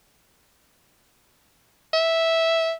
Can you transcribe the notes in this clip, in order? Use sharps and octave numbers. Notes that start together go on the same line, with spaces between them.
E5